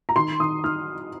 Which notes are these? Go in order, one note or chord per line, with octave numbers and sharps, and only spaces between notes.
A#5
D#3 C6
D#3 D#6
D#4 F6